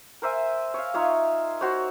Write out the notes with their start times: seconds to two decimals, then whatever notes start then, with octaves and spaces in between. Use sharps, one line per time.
0.22 A#4 C5 E5 G#5
0.74 C#5 F5
0.94 D#4 F4 C#5 E5
1.61 F#4 C5 C#5